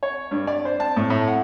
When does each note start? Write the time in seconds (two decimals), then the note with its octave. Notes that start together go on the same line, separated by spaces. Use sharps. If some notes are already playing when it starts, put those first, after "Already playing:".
0.03 C#5
0.31 G2
0.47 D5
0.65 C5
0.80 A5
0.96 A2
1.10 A2
1.28 F#5